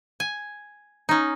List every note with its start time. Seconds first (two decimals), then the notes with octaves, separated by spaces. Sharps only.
0.20 G#5
1.09 C#4 D#4